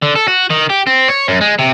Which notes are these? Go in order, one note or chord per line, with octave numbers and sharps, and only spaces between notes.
D3
A4
F#4
D#3
G4
C4
C#5
F#2
G#3
C3